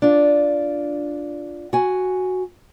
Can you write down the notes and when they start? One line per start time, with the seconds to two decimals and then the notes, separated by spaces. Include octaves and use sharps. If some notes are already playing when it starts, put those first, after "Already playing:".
0.02 D4 F4
1.73 F#4 G#5